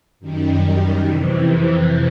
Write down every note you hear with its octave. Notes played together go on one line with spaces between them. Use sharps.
F#2 D#3 G3
F2 C3 E3